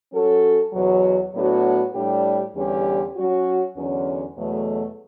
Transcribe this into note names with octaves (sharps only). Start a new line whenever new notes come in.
F#3 C#4 F#4 A4
E2 B2 F#3
A2 F#3 B3 D4 F#4
A2 G3 D4 G4
E2 D3 G3 C#4 G4
F#3 C#4 F#4
E2 D3 F#3 C#4
E2 B2 F#3 A3